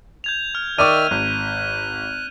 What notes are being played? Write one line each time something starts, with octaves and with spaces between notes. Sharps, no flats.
G6 G#6 F7
F6
D#3 D5 E5 C#6 D6 F6 D#7
G#1 F#6